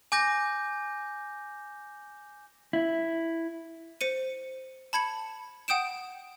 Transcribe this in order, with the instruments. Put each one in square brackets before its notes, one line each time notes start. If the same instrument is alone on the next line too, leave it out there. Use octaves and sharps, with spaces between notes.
[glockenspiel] G#5 D6 G6 A#6
[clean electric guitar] E4
[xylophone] C5 C#7 D#7
A5 B5 G#6 C#7 F#7
F#5 G5 D#6 G6 D7 E7